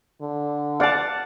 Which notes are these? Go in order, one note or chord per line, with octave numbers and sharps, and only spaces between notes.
D3
D5 F5 F#5 A5